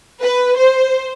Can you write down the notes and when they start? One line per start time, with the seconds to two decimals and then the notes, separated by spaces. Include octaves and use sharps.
0.22 B4
0.58 C5